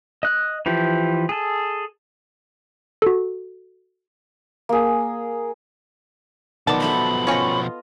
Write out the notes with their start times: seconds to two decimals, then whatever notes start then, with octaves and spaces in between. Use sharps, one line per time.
0.23 D#5 F#6
0.66 E3 F3 G4
1.29 G#4 A4
3.02 F#4 A4
4.69 A#3 G#4
6.67 B2 D#3 F3 F#3 B3 D5 A5
6.80 A4 E5 F#5 B5
7.27 C4 C#4 F4 C#5 D#5